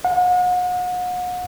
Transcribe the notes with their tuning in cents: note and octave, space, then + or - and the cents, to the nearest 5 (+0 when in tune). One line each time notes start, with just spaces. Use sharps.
F#5 -40